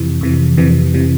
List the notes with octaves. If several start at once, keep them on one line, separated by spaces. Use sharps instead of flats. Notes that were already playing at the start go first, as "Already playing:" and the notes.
Already playing: F2 C3 E3
F2 C3 E3
F2 C3 E3
C3 E3